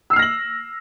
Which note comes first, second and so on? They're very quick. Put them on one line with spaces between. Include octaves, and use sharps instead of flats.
E6 C7 F6 A#6 F#7